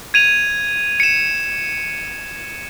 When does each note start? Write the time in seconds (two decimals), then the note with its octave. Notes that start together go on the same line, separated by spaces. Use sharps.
0.14 G#6 D#7 F7
1.00 C#7 E7